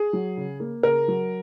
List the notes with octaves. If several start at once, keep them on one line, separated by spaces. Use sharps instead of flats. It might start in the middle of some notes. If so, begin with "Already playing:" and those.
Already playing: G#4
F#3
C#3
A#3
C#3 A#4
F#3